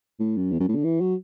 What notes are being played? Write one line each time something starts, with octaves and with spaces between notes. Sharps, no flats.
A2
F#2
E2
F#2
A2
D3
E3
F#3